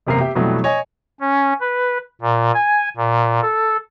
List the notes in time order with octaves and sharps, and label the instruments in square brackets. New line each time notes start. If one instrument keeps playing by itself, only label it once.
[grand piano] E1 F#2 C3 A#3 A#4 C7
G4 E5 G5
F2 B2 E3 F#3 G3 A3
C#5 D#5 G#5
[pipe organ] C#4
B4
A#2
G#5
A#2
A4